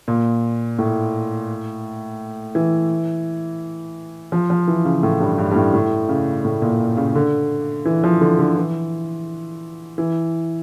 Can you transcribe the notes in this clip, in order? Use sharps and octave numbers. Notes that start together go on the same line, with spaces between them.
A#2
A2
E3
F3
F3
E3
C#3
A2
G2
G2
G2
A2
A2
C#3
A2
A#2
C#3
D3
E3
F3
D3
D3
E3
E3